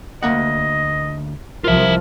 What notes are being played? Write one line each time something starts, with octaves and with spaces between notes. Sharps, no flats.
D2 A#3 D#5 F#5
C2 F3 F4 A#4 E5